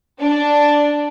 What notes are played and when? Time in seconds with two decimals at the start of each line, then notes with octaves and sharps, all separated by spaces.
0.21 D4